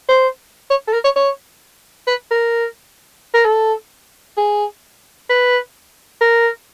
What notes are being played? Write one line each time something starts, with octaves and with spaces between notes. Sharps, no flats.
C5
C#5
A4
A#4
C#5
C#5
B4
A#4
A#4
A4
G#4
B4
A#4